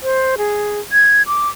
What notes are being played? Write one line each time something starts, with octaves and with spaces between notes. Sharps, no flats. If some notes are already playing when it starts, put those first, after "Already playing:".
C5
G#4
G#6
D6